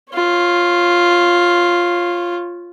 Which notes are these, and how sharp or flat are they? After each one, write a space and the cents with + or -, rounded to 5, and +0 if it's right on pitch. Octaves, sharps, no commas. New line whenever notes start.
F4 +0 C#5 -25